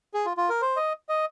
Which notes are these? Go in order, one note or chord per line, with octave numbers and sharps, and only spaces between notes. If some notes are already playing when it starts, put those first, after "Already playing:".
G#4
F4
F4
A#4
C5
D#5
D#5